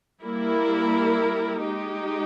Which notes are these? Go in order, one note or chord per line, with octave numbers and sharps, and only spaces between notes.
G3 A#3 E4 A#4
G#3 D#4 G4